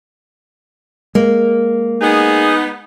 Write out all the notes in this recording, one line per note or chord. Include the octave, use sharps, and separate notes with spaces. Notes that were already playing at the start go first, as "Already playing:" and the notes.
G#3 A#3
B3 D#4 G#4